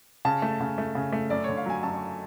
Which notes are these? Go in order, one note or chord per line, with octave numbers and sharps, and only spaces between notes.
C#3 A5
A3
C#3
A3
C#3
A3
F#2 D5
D3 C#5
F5
F#3 G#5
F#2 A5